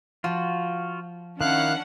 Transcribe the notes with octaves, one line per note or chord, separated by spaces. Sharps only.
F3 F4 F#4
D#3 C#4 D4 E4 F5 F#5 F#6